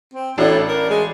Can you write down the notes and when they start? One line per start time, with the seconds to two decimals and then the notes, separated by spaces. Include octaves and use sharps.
0.14 C4
0.38 A1 A2 D4 F#4
0.68 A#4
0.90 G#3